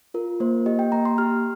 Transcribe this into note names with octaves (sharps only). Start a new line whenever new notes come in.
F4 A#4
A#3 C5
G4 D#5
G5
A#3 A#5
C6
G4 F6